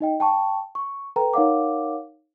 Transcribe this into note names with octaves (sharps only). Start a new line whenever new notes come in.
D#4 D#5 G5
G5 A5 C#6
C#6
A4 B4 G5 A#5
D#4 A#4 C#5 F5 F#5 D6